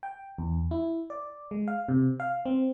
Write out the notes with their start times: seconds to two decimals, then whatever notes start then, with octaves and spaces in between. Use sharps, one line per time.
0.03 G5
0.38 E2
0.71 E4
1.10 D5
1.51 G#3
1.68 F5
1.89 C3
2.20 F5
2.46 C4